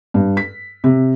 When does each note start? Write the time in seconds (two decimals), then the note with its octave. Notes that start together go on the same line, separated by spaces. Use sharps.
0.14 G2
0.37 B6
0.84 C3